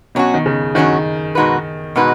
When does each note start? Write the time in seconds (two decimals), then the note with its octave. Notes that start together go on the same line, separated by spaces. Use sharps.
0.15 B2 F#3 C#4 F#4
0.34 D#3
0.46 C#3
0.75 D#3 F#3 C#4 F#4
1.35 B2 G#3 D#4 F#4 B4
1.96 B2 G#3 D#4 F#4 B4